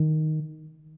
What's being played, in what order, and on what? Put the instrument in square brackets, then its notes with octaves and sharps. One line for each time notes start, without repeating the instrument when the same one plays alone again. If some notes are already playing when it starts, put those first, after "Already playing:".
Already playing: [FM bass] D#3